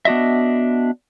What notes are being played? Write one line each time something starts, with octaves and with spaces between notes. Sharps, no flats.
B3 D4 F#4 D#5 E5